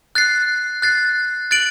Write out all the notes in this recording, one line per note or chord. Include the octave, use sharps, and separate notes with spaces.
F#6 A6 C7
F#6 A6 C7
F#6 A6 D7 F#7